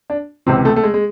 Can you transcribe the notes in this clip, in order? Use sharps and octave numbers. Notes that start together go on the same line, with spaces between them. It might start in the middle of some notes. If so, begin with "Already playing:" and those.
D4
C#2 C3 E3 C4
A3
A3
G#3
G#3